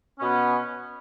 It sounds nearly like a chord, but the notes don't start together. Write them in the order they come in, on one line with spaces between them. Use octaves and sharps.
C#4 B2 B3